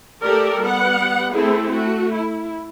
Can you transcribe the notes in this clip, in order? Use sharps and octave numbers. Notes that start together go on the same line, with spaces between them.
A3 G4 A4 A#4 D5
G3 B3 F#5
A3 C4 E4 G#4 A4
A3 F#4
E4